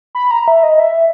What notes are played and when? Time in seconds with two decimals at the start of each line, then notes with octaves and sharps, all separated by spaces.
0.15 B5
0.31 A#5
0.48 E5
0.63 D#5
0.80 E5